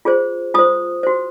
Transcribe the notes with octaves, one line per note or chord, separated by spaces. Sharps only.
F4 G#4 C5
F4 C5 D#6
F#4 C5